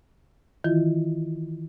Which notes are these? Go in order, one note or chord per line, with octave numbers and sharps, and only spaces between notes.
D#3 E3 E4 F4